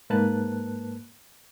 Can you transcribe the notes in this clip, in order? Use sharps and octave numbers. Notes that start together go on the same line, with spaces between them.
G#2 A#3 B4 A5 F#6